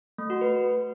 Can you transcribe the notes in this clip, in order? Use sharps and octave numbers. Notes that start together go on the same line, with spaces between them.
A3
F#4
B4